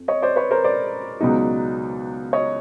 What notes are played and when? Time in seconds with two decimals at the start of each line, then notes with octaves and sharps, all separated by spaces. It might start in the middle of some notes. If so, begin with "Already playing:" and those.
Already playing: F2
0.08 C#5 D#5
0.22 C5 D5
0.36 B4 C#5
0.51 A#4 C5
0.64 C5 D5
1.20 C#2 B2 F#3 B3 D#4
2.33 C#5 D#5